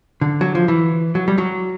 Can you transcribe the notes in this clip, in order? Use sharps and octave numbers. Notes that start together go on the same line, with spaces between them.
D3
F#3
F3
E3
F#3
G3
F#3